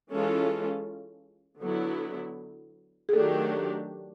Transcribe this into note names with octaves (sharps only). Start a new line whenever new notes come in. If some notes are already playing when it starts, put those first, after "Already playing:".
E3 G#3 C#4 F4 A4
D3 F#3 B3 E4
G#4
D#3 F#3 A3 D4 G4 A4